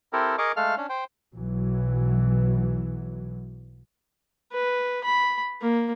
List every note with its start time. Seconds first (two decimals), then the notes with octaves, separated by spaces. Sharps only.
0.13 C4 E4 G4 A4 A#4
0.38 G#4 A#4 D#5 C#6 D6
0.56 G#3 A3 A4 F5 F6
0.77 C#4 D4
0.89 C5 G5
1.34 B1 B2 E3 F#3
4.52 B4
5.04 B5
5.61 A#3